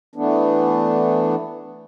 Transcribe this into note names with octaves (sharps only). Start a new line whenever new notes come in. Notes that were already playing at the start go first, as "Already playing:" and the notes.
E3 A3 B3 D4